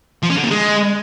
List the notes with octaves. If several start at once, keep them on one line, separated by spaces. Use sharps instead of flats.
F3
C#4
D3
A#2
G#3